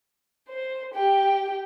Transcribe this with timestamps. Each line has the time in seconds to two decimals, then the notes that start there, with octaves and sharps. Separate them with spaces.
0.49 C5
0.94 G4 G5